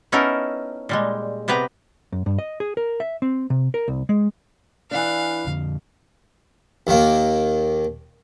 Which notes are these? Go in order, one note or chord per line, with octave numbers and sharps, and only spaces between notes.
B3 C#4 D#4 E4 A4 A#4
A#2 G3 G#3
C3 B3 G4 B4 A#5
F#2
G2
D#5
G#4
A#4
E5
C4
C3
A#4
C2
G#3
E3 D4 F5
F2 D3
D#2 D#3 A#3